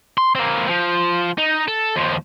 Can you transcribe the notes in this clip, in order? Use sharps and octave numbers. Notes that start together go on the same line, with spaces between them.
C6
A#3 C4
F3
D#4
A4
D#2 F3